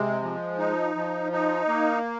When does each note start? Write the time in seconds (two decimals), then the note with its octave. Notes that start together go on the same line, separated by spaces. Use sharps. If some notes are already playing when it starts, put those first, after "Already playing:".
Already playing: C3 G#3
0.23 F3
0.58 D#4
0.95 F3
1.32 D#4
1.68 A#3